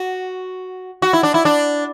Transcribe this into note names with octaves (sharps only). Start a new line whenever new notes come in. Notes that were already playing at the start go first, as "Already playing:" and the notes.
Already playing: F#4
F#4
E4
D4
E4
D4